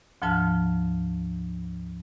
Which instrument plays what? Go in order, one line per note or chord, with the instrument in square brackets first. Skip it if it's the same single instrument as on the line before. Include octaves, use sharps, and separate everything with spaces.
[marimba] D2 G#2 F3 A5 F6